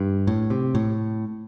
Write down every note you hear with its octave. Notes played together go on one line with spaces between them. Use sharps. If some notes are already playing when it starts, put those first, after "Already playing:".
Already playing: G2
A2
C3
A2